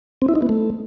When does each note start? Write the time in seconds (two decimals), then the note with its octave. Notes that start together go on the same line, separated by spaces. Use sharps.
0.22 C4
0.29 E4
0.35 D#4
0.42 B3
0.49 A3